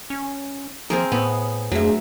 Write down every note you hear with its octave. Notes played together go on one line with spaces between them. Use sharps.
C#4
F3 C4 G#4 A#4
A2 B3
F2 F#3 A3 D4 G#4 E5